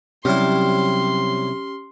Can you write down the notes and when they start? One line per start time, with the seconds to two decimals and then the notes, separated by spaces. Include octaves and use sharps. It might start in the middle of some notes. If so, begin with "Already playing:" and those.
0.25 C3 F#3 G3 C#4 E4 G4 C6 F6